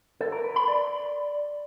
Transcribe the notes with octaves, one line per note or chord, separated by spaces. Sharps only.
A4
A#4
B4
B5
D5